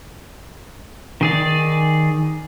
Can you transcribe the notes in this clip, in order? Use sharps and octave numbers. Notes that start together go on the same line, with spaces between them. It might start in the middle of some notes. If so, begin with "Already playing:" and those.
D#3 G#4 D5